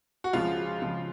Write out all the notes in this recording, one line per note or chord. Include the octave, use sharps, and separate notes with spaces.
F#4
C#2 C#3 F3 F4
C#2 C#3 F3